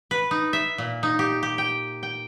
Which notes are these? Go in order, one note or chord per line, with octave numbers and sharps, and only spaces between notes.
B4
D#4
E5
A#2
D#4
G4
G4
G5
G5